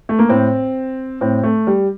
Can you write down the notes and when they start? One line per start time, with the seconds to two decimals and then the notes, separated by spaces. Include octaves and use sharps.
0.09 A3
0.19 A#3
0.29 A2 C4
1.21 A2 C4
1.43 A3
1.67 G3